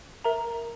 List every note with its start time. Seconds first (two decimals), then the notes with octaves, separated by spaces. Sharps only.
0.24 A#4 E5 A#5